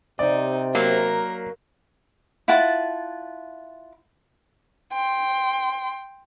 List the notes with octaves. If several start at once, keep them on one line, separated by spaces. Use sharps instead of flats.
C3 D#4 D5
F#3 A#3 A#4
E4 F4 F#5 A5
G5 C6